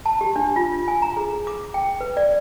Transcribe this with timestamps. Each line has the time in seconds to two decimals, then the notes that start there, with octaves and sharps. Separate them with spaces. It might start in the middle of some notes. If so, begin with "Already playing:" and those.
0.06 A5
0.21 G4
0.36 D4
0.56 F4
0.88 G#5
1.02 A#5
1.17 G#4
1.47 D6
1.74 G5
2.01 B4
2.17 D5